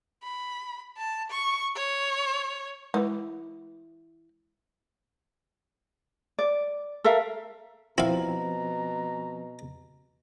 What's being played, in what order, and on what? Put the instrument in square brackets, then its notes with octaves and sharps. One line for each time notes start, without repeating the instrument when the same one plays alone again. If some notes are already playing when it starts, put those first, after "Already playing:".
[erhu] B5
A5
C#6
C#5
[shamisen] E3 [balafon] G#3
[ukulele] D5
A4 A#4 E5 F5
[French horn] B2 [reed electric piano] F3 C4 [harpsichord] E4 F5 [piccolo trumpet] A#5